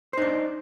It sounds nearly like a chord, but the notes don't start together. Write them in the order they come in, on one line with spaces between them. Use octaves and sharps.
C5 D#4 D4